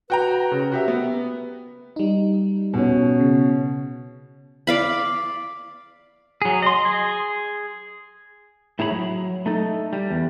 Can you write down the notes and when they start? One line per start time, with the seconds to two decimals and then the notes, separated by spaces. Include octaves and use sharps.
0.10 F#4 B4 G5 A#5
0.51 C#3
0.72 F#4 G4 E5
0.88 B3
1.96 G3 D#4
2.73 B2 C#4
3.20 C#3
4.67 D5 F5 B5
6.42 F#3 G#4
6.62 D#5 C6
6.85 G#4
8.79 A2 E4 G#4 C#5 A#5 B5
8.91 F#3
9.46 A3 D#4 A4
9.93 G3
10.10 E2